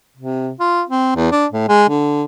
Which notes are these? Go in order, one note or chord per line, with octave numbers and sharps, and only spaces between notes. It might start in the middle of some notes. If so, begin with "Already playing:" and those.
C3
F4
C4
E2
D4
A2
G#3
D3